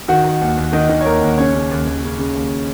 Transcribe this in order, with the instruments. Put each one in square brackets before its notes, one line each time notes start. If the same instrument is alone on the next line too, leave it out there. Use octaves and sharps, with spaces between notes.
[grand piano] D#3 F#4 F#5
D#3
D#2
D#2
D#3 D#4 D#5
D#3
C#5
D#2 A#4
D#2
C#3 C#4 C#5
C#3
D#2
D#2
C#3
C#3
D#2